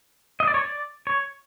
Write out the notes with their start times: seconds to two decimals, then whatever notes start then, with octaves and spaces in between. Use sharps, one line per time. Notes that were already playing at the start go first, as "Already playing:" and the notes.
0.40 D#5
0.47 D5
0.54 C#5
0.61 D5
1.07 C#5